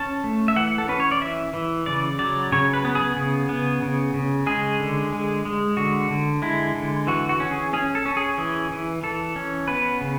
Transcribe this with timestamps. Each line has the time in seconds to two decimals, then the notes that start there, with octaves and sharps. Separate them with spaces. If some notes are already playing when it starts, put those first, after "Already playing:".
Already playing: C#4 A5
0.24 A3
0.48 E5
0.56 E3 F#5
0.78 A4
0.88 C#4 B4
1.00 C#5
1.11 D5
1.22 E3 E5
1.54 E3
1.86 C#3 D5
2.19 F#3 D5
2.52 C#3 C#5
2.74 B4
2.85 B3
2.95 G#4
3.17 C#3
3.49 B3
3.82 C#3
4.14 C#3
4.47 G#3 G#4
4.80 D3
5.13 G#3
5.45 G#3
5.77 D3 F#4
6.11 D3
6.42 G#3 E4
6.75 D3
7.07 E3 F#4
7.29 F#4
7.40 C#4
7.51 G#4
7.73 C#4 G#4
7.95 A4
8.06 C#4
8.17 G#4
8.38 E3 G#4
8.71 E3
9.03 E3 A4
9.36 C#4
9.68 B3 B4
10.01 C#3